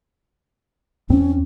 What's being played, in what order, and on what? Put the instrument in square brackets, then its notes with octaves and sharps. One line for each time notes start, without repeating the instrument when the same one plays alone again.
[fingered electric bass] E2 C4 [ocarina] C#4